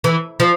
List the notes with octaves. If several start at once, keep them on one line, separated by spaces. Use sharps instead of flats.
E3
F3